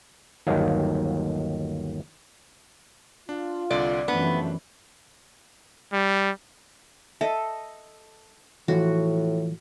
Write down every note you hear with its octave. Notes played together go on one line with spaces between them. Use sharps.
G1 D#2 D#3 F#3 F5
D4 F4
C2 D3 D5
F#2 C3 E3 F3 A3 B3 D4
G3
A4 D#5 E5
A2 E3 F3 F#4